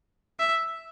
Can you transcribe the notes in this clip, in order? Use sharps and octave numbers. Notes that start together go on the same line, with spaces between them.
E5